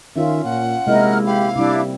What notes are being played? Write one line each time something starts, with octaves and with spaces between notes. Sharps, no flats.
D#3 C#4 F4 E5
A#2 F#5
C3 G#3 A#3 E4 A#4 D#5 F6
G4 F5 B5
C3 G3 D4 E4 D6